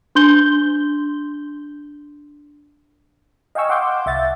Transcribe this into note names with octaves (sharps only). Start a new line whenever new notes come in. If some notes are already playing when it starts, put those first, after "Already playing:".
D4 C6 G6 G7
D#5 F5 G5 G#5 C#6 E6
F5 F#5 C6 D6 G6
C2 E5 F#5 A6